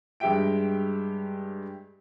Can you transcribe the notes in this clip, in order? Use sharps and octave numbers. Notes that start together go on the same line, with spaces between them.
G2 G#3 G4 E5 G5 D7